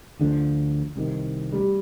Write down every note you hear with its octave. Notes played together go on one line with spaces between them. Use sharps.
D2 D3 F3
C2 C3 D#3
G3